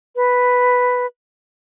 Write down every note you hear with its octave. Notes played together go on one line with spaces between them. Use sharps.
B4